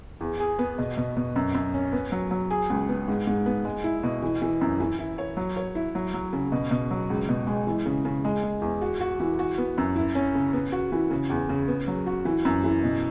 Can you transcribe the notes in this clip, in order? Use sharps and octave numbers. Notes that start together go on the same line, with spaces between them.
E2
G#4
B3
B2
B2
B2
F#2
F#2
C#4
B3
F#3
F#3
G#4
C#2
B3
G#2
G#2
B3
G#3
E4
B2
E3
E3
F#2
E3
E4
C#5
F#3
C#5
E4
F#3
F#3
C#3
B2
B2
F#3
C#2
B2
G#3
E3
C#3
C#3
G#3
G#3
E2
F#4
F#4
E3
F#4
B3
F#2
E4
C#4
C#3
B3
F#4
E3
C#3
E2
C#3
B3
F#3
F#4
E3
F#2
E3
B2